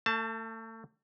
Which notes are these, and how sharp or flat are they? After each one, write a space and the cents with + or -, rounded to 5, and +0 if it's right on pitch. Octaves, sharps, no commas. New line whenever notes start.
A3 +35 A5 +0